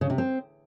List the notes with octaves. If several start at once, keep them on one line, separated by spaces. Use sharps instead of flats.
C#3
C3
C4